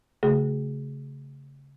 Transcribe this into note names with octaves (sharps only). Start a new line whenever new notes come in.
C#3 A3 F#4 G#4